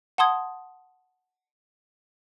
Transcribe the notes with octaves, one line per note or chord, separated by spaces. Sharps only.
F#5 A5 C6 D#6 G#6